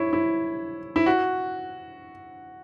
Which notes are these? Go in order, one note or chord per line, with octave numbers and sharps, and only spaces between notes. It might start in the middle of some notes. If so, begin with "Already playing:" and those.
Already playing: E4 C#5
E4
E4
F#4